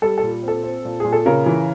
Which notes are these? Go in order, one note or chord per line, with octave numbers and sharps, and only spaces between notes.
G3 A4
A4
A#2
C4 A4
C4
A#2
A#2 G#4
A4
C#3 A#4
E3